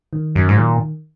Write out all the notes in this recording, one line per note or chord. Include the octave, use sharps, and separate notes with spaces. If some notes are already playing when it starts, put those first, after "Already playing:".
D#3
F#2 F#3
G#2
A#2 D#3